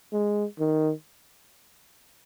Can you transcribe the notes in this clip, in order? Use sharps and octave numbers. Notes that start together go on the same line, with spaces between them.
G#3
D#3